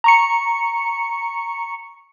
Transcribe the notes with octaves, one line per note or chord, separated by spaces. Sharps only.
A#5 C#6 C#7